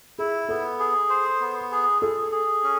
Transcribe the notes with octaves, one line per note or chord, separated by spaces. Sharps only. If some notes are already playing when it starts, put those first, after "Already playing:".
E4 G#4
B3 A4
G#4
C5
B3
G#4
G#4 A4
G#4
C#4